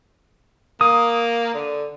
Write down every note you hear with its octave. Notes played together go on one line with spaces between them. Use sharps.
A#3 D#6
D3